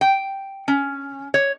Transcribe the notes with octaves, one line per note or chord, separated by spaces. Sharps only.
G5
C#4
C#5